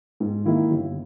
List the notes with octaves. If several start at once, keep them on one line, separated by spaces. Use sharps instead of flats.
G#2
D#3 A#3 E4
G1